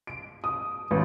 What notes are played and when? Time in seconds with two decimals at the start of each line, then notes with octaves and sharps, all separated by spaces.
0.07 D7
0.44 D#6
0.91 A1